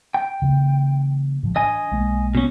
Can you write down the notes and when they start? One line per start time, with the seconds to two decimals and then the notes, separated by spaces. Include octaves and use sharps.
0.14 G5
0.42 C#3 E3 A#3
1.43 A2 F3
1.56 E3 D4 D#5 G#5
1.91 B1 G#3 A#3
2.35 B2 C#4